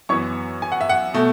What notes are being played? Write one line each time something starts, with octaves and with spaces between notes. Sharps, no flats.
F#2 E3 B3 C#5 C#6
G#5
F#5
E5
F#5
B2 A3